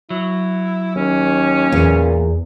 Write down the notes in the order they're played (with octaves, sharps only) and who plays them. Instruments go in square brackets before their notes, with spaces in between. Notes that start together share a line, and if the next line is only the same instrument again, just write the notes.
[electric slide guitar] F#3 [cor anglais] E4
[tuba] D#2 [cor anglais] C#4
[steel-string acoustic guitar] E2 [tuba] A#2